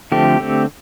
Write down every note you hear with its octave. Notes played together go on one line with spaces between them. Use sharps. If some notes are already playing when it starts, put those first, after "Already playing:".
D3 F3 A3 C4 G4
D3 A3 C4